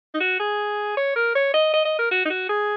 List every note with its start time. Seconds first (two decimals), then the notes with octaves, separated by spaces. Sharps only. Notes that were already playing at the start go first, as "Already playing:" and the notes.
0.14 D#4
0.20 F#4
0.40 G#4
0.97 C#5
1.16 A#4
1.35 C#5
1.54 D#5
1.74 D#5
1.85 D#5
1.99 A#4
2.11 F#4
2.25 D#4
2.30 F#4
2.49 G#4